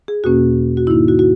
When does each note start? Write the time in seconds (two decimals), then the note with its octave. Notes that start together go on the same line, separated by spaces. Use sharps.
0.08 G#4
0.24 E2 B2 A#3 C#4 F#4
0.77 F#4
0.87 G#2 D#3 A#3 D#4 E4
1.08 F#4
1.19 F#4